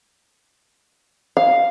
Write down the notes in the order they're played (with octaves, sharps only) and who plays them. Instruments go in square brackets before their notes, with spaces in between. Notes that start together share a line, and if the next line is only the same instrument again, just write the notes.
[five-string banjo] F5